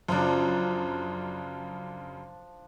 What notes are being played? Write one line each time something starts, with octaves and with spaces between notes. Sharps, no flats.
F#2 C#3 F3 D4